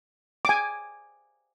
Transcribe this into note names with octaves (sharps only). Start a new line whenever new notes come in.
G#5 D6